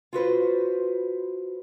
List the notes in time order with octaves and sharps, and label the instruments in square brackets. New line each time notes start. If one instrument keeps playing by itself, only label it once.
[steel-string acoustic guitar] F4 F#4 B4 C5